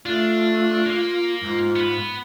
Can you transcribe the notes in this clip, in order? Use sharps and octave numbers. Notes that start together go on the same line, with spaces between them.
A3 D4 F4
A#3
G#2 F4
B3 B5